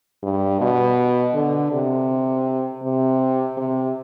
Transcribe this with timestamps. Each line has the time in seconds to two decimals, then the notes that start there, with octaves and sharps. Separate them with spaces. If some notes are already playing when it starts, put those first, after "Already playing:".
0.23 G2
0.61 B2
1.35 D3
1.72 C3
2.83 C3
3.57 C3